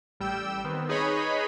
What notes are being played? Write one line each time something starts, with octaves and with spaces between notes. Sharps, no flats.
A1 G3 G5 E6
D#3 B3 C4
D#4 G#4 B4 C#5 D#5 B5